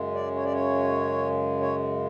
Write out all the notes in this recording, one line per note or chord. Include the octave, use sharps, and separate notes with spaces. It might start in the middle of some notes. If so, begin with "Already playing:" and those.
Already playing: F#2 C#3 G#3
D5
C#5
D5
C#5
C#5